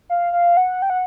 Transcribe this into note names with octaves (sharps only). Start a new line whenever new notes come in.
F5
F5
F#5
G5
F#5